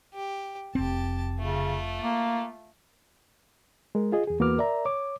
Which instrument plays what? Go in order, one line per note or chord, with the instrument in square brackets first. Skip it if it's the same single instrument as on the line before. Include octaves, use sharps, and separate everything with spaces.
[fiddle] G4
[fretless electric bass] F1 C4 [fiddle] G4 A5
[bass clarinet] C#3 [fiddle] A3 F4
[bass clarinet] A#3
[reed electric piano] G#3 A#4
F4 G#4 D#5
E2 G#4
E2 A#3 F#4 B4 D6 F6
A#4 D5 E5 A#5
C#5 D6